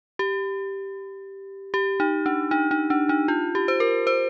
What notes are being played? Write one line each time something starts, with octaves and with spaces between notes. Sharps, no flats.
G4
G4
D#4
D4
D#4
D#4
D4
D#4
F4
G4
C5
A#4
C5